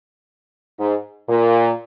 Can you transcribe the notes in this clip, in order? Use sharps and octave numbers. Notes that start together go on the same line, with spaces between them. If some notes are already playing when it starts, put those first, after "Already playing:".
G#2
A#2